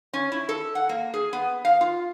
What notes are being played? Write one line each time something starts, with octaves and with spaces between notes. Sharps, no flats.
C#4
E4
A4
F#5
A#3
G#4
B3
F5
F4